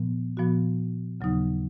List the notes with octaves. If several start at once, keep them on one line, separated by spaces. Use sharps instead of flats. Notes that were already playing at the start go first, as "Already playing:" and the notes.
Already playing: A#2 F3 B3
A#2 F3 B3 F#4
D#2 C#3 F#3 B3 D#4